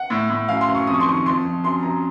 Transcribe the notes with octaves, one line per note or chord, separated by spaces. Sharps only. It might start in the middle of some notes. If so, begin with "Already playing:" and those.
Already playing: F#5
A2
A2
F#2 F5
C6
F#2
C#6
F2 D#6
C#6
C6
D#3 C#6
F2 C6
F2
F#2 C6
F#2 A#5